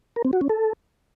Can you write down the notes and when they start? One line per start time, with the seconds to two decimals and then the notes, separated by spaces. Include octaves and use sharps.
0.16 A#4
0.25 C4
0.33 F#4
0.41 C#4
0.50 A4